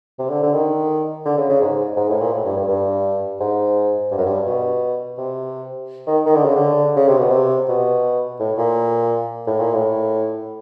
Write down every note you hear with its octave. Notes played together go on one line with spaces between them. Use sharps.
C3
D3
D3
D#3
D3
C#3
C#3
G#2
G#2
A2
A#2
A2
G2
G2
G2
G#2
G2
F#2
G2
B2
C3
D#3
D#3
D3
C#3
D3
C#3
C3
B2
C3
B2
A2
A#2
A2
A#2
A2